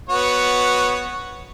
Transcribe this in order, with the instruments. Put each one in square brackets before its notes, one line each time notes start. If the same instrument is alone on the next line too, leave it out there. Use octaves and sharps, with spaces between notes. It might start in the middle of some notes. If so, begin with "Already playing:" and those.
[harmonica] B3 F#4 C#5